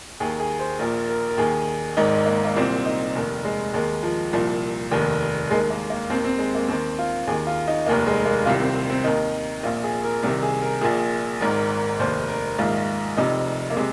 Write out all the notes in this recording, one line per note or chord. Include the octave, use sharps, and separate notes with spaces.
D#2 D#3 G#4
G#4
C5
A#1 A#2 A#4
A#4
A#4
D#2 D#3 G#4
G#1 G#2 D#3 D#4
A#3
A#3
C2 A#2 C4
D#4
F1 D#2 D#3
G#3
D#2 D#3 G#3
F3
C2 A#2 F3
F1 D#2 D#3
D#2 D#3 G#3
A#3
A#3
D#2 D#3 C4
C4
G#3
A#3
D#2 D#3 C4
F4
D#2 D#3 G#4
F4
D#4
F1 D#2 D#3 A#3
G#3
A#3
C2 C3 D#3 F4
C4
C4
D#2 D#3 D#4
A#1 A#2 F4
G#4
A#4
C2 C3 D#3 A#4
G#4
A#4
A#1 A#2 G#4
G#1 G#2 D#3 A#4
F1 D#2 D#3 C5
A#4
A#1 G#2 D#3 F4
F1 F2 C3 D#4
A#3
C3 G#3